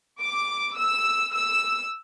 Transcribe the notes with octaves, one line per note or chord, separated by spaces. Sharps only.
D6
E6
E6